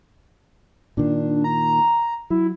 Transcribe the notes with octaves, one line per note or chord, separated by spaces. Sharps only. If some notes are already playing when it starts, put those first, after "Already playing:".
A#2 D#3 D4
A#5
F#3 E4